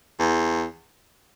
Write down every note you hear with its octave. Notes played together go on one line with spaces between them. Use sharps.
E2